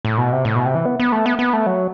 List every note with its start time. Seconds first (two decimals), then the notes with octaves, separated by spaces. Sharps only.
0.05 A2
0.18 B2
0.32 C3
0.45 A2
0.55 B2
0.65 C3
0.75 E3
0.85 B3
1.00 B3
1.12 A3
1.26 B3
1.39 B3
1.53 A3
1.66 F#3